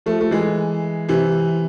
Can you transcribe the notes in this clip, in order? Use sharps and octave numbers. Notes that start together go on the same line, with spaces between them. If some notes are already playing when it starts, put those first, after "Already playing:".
F3 A3
A3
E3 G#3
C3 E3